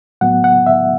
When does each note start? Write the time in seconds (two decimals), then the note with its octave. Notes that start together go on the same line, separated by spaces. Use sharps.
0.21 A2 F#3 B3 F#5
0.44 F#5
0.67 E5